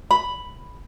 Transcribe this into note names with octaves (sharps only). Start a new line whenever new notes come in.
B5